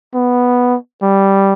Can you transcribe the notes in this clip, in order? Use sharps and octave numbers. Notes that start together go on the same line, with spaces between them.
B3
G3